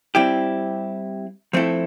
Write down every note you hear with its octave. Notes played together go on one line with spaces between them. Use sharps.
G3 C4 E4 G4
F3 A3 C4 E4 A4